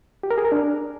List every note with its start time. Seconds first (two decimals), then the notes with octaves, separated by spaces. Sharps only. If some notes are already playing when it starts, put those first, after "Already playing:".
0.23 G4
0.31 A#4
0.38 G#4
0.45 A#4
0.52 D4